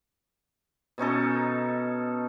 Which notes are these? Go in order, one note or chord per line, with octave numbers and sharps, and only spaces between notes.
B2 C#4 D#4 A4